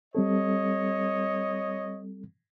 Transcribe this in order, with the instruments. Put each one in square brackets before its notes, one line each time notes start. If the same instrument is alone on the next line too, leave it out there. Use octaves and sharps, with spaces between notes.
[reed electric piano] G3 C4 A4 [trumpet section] C#5 D#5